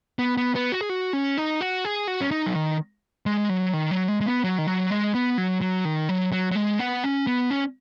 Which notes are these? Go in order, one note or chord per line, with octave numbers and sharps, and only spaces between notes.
B3
B3
B3
F#4
G#4
F#4
C#4
D#4
F#4
G#4
F#4
C#4
D#4
F#3
D#3
G#3
F#3
D#3
F#3
G#3
G#3
B3
F#3
D#3
F#3
G#3
B3
F#3
F#3
D#3
F#3
F#3
F#3
G#3
B3
C#4
B3
C#4